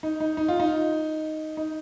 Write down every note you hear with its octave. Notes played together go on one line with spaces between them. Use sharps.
D#4
D#4
D#4
F4
D#4
D#4